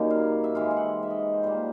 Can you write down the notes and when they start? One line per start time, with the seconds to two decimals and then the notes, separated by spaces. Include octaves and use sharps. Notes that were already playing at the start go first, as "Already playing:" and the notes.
Already playing: F#2 D#3 G3 A#3
0.10 F5
0.44 E5
0.55 G#2 E3 G#3 F5
0.71 F5
0.77 F#5
1.03 E5
1.10 D#5
1.33 C5
1.43 A#2 G3 A#3 C5